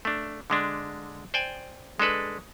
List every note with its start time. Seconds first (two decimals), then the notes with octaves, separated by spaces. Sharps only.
0.05 A3 D4
0.50 D3 G#3 D4
1.34 C5 D5 G5 G#5
2.00 G#3 D4 A4 B4